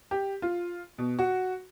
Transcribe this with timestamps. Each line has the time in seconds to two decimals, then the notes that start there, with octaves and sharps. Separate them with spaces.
0.11 G4
0.42 F4
0.98 B2
1.19 F#4